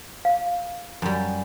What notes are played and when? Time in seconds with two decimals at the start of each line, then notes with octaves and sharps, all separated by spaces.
0.25 F5
1.02 F#2 G3